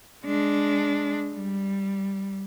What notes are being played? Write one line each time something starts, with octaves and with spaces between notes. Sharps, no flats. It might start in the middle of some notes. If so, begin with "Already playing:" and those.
G#3 D4
G3